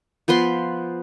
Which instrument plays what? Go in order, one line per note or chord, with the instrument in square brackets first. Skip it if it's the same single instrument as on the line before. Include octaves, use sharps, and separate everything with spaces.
[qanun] F3 B3 B4 C6